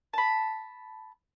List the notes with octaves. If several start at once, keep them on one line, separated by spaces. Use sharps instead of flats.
A5 B5